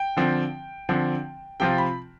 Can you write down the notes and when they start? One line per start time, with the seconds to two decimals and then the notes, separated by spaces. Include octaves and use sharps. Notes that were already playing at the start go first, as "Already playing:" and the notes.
Already playing: G5
0.17 D3 F3 C4
0.89 D3 F3 C4
1.60 C3 F3 C4 F4 G5
1.78 B5